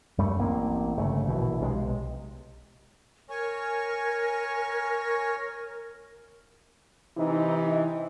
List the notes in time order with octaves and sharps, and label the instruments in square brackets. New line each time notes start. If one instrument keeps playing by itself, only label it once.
[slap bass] F#2 G3 A3
A1 A#3 C4
G1 C#3 A3
A#1 B2 E3
B1 C3 G3 G#3
[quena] A#4 [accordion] C#5 G#5 C#6
[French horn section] C3 E3 D#4